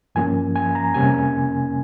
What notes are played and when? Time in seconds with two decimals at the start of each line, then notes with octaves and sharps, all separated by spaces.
0.15 G2 F3 A#3 C#4 G#5
0.56 G#5
0.75 A#5
0.94 F2 C3 G3 A#3 C#4 G#5